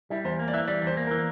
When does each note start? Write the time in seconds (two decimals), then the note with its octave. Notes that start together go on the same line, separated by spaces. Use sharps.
0.10 G3 E4
0.25 E2 C5
0.39 A#3
0.48 D5
0.54 E3 E5
0.67 G3 D5
0.82 E2 C5
0.97 A#3
1.07 E3 A#4